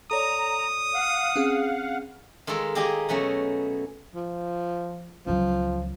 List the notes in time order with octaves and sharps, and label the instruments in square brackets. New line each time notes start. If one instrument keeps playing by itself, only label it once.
[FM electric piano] A4 C#5 D5 [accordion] A#5 [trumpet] D#6
[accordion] F5 F#5
[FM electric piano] C4 C#4 G#4
[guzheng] D#3 G#3 F4 A4 A#4
A#3 G4 G#4 D#5
B2 F#3 A3 C#4
[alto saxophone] F3
[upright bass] C#2 F#3 [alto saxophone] F3